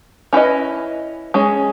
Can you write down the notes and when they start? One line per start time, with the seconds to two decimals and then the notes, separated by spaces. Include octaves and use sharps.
0.33 C#4 E4 B4 D#5
1.34 G#3 C#4 G#4